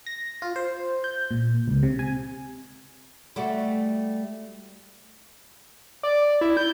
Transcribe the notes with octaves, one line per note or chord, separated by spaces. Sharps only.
A#6
F4
C5
G6
A#2
C#2
C3
G#5
G3 A3 F#4
D5
E4
G6